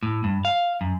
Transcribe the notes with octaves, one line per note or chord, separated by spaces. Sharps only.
A2
G2
F5
F#2